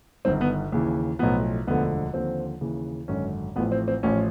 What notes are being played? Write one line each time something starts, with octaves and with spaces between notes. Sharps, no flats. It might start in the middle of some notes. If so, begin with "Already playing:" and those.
G1 G2 D#3 C4
B3
D#2 C#3 E3
B1 A2 F3 B3
E1 D2 D3 F3 B3
D#2 D3 F3 C4
D#2 C#3 E3
G#1 F#2 D3 C#4
A1 A2 F3 B3
C4
C4
A1 A2 F3 C#4